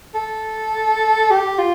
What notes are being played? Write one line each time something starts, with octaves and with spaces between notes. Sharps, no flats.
A4
G4
F4